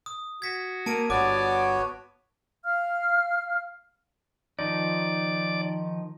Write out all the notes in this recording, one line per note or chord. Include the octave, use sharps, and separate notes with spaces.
D#6
F#4 G#6 B6
A#3 A5 D7 D#7
G1 B3 F#4 C#5 D5 D6
F5 F6
D#3 F3 D#4 D5